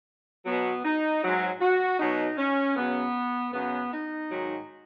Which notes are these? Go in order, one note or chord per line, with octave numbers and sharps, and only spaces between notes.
B2 F#3 B3
D#4
G#2 F#3
F#4
B2 F#3 D#4
C#4
F#2 C#3 F#3 B3
F#2 C#3 F#3 B3
D#4
G#2 D#3 F#3